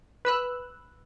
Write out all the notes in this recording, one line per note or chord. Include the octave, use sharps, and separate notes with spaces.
B4 E6 F#6